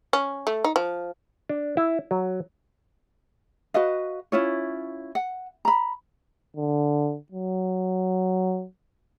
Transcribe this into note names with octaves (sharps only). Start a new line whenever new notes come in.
C#4
A3
D#4
F3
D4
E4
F#3
F#4 B4 D#5 F5
C#4 E4 F4 C#5
F#5
A#5 B5
D3
F#3